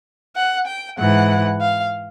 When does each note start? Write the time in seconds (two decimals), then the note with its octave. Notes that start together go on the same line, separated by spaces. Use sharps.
0.36 F#5
0.67 G5
0.98 G#2 E3 F#5
1.61 F5